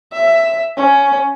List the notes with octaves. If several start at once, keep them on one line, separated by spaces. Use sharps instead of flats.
E5
C#4